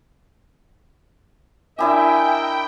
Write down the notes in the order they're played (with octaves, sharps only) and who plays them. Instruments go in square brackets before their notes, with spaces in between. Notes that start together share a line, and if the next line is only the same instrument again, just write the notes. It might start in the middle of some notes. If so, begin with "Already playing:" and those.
[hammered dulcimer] D4 E4 G4 [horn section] A#4 D#5 E5 [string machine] G5 [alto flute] G#5